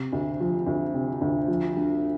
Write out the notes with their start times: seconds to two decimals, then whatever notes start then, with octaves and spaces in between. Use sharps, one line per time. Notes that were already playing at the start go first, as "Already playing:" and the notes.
Already playing: C3
0.12 D2
0.40 F3
0.67 D2
0.94 C3
1.21 D2
1.48 F3
1.77 D3